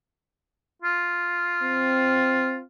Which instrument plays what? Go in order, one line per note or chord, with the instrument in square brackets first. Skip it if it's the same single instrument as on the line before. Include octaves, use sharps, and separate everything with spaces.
[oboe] F4
[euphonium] C4